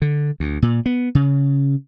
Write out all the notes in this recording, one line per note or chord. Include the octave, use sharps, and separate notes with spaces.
D3
D2
A#2
B3
C#3